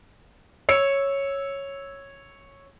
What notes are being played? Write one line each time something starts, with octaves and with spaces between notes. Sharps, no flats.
C#5 E6 C#7